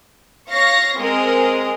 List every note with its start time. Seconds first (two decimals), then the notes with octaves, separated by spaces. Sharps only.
0.49 C#5 F5 C#6 A#6
0.98 G#3 C4 G#4 A#4